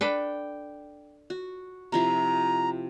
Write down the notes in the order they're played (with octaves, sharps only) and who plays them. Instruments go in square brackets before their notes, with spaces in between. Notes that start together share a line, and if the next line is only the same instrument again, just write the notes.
[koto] D4 A4 B4 [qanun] G5
[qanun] F#4
[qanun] C3 F3 E4 [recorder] A#5